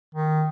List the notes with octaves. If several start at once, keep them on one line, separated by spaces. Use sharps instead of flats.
D#3